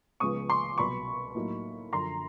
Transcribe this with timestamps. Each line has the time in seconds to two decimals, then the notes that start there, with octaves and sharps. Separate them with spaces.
0.20 C#2 C#3 F3 G#3 B3 C#6 D#6
0.49 C6 D6
0.78 C2 B2 F#3 B5 C#6
1.35 A2 F#3 A#3 D#4
1.93 F#2 D3 F3 A#5 C6